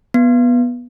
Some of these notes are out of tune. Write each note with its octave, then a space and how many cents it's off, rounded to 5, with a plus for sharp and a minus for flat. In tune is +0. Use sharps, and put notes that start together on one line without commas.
B3 -15